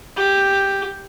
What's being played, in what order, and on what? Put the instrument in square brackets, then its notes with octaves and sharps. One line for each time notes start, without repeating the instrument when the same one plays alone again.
[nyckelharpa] G4